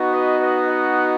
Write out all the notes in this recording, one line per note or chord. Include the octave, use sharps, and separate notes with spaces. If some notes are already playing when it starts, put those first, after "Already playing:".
Already playing: B3 D#4 F#4
B4 D#5
B4 D#5
D#5 F#5